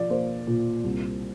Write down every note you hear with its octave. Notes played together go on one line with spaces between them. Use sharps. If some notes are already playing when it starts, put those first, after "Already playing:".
Already playing: F3 D5
A#3 C5
A#2
C2